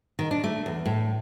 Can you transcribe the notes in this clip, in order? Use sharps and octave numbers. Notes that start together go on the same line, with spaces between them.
D#3
D4
A3
E2
A2